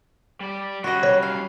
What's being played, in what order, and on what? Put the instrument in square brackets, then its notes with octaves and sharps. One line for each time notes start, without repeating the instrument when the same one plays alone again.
[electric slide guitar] G3 D5
[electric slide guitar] F#3 G3 C#4 [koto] F#4 D#5
[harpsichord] C#5
[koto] F5